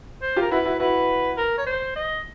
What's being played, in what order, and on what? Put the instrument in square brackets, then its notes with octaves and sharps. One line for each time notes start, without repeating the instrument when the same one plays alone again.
[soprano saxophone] C5
[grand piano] F4 G4
[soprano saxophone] A#4
[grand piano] E4 F#4 [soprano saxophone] B4
[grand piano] E4 F#4
[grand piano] E4 F#4 [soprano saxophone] B4
[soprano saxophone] A#4
C#5
C5
D#5